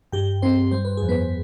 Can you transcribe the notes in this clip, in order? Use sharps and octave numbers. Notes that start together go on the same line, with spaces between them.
G2 G4 G5
G2 C4 C5
G3 C5
B4
F2 G#4
B3 B4